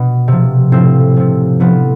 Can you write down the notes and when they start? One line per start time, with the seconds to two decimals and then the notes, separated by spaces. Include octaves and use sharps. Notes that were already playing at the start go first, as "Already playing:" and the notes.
Already playing: B2
0.28 C3 F3
0.72 A2 F3 C4
1.16 C3 F3
1.60 A2 F3 B3